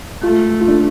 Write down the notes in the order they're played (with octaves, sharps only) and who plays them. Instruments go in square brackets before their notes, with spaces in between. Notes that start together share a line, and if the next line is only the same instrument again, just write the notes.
[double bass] A3 [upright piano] F4
[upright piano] F4
D4